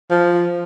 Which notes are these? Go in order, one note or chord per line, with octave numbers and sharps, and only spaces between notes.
F3